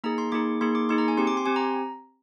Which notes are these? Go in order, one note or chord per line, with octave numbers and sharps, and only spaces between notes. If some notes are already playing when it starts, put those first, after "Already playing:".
A#3 D#4 G#4 A#5
C6
A#3 D#4 G#4 D6
A#3 D#4 G#4 C6
D6
A#3 D#4 G#4 C6
A#5
G#5
C4 G4 C6
D6
C6
C4 G4 G#5
A#5